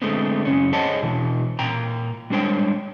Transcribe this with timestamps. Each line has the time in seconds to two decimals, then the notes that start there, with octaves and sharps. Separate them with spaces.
0.02 D3 G#3 A3 B3 C4
0.45 F#2 C#3 C#4
0.73 G#4 C5 C#5 D#5 F#5 A5
1.03 B2 E3
1.59 A#2 G5 A#5
2.30 G3 G#3 D4 C5 C#5 G5